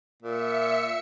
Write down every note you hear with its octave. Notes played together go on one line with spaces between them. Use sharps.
A#2 E5 C#7